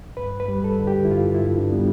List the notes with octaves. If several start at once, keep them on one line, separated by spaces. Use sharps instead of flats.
G2 B4
B4
G3
A4
D3
G4
E4
G2 F4
E4
G2
D4
G3 B3